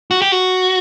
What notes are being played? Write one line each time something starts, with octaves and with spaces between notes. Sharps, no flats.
F#4
G4
F#4